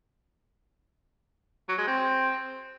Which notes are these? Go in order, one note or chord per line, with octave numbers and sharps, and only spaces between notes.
F#3
G#3
C4